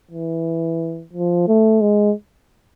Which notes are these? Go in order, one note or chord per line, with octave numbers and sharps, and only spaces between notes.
E3
F3
A3
G#3